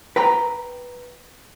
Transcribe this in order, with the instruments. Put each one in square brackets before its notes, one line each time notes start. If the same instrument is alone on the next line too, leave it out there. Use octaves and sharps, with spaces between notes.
[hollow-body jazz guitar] B4 G5 A#5 C6